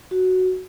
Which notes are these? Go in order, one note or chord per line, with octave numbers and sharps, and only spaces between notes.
F#4